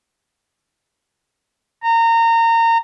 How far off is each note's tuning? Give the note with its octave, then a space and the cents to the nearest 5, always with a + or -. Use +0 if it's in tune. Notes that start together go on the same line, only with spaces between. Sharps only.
A#5 -25